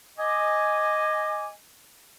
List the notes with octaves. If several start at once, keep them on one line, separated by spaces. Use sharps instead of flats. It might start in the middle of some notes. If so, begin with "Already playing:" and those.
D#5 G#5 D6